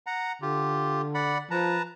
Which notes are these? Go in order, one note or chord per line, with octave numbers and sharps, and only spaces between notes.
F#5 A#5
D3 F4 G4
D5 F#5 B5
F3 B4 A5 A#5